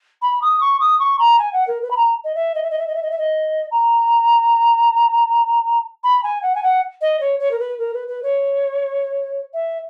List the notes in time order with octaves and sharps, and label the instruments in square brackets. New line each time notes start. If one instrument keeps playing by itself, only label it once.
[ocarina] B5
D#6
C#6
D#6
C#6
A#5
G#5
F#5
A#4
B4
B5
A#5
D#5
E5
D#5
E5
D#5
E5
D#5
E5
D#5
E5
D#5
A#5
B5
G#5
F#5
G#5
F#5
D#5
C#5
C#5
A#4
B4
A#4
B4
B4
C#5
E5